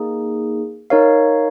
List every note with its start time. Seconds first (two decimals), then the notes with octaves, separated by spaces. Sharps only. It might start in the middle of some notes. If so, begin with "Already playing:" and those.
Already playing: A#3 D#4 G#4
0.90 D#4 A#4 C#5 F5